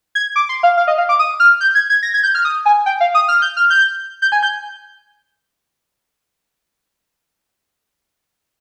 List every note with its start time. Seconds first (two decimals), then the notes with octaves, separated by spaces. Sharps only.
0.15 G#6
0.36 D6
0.49 C6
0.63 F5
0.77 F5
0.87 D#5
0.98 F5
1.09 D6
1.19 D#6
1.40 F6
1.61 G6
1.75 G#6
1.90 G#6
2.03 A#6
2.14 G#6
2.23 G6
2.35 F6
2.45 D#6
2.66 G#5
2.86 G5
3.00 F5
3.15 D#6
3.28 F6
3.42 G6
3.57 F6
3.70 G6
4.22 G6
4.32 G#5
4.43 G6